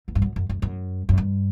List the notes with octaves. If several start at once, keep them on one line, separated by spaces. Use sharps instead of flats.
E2
G2
F#2
F#2
F#2
F#2
F#2
G2